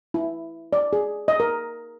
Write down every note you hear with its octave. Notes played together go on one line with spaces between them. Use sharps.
E4
D5
G#4
D#5
A#4